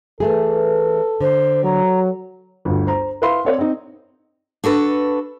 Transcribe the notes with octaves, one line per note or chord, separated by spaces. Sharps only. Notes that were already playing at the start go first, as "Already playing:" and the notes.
E3 A3 G#4 A4
D3 C5
F#3 A#5
G1 D2
C5 A#5
E4 B4 E5 F5 B5 C6
C4 C#5 D5
C4 D#4
D4 F#4 A4 B4